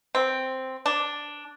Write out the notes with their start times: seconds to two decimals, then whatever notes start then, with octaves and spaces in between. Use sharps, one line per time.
0.15 C4
0.86 D4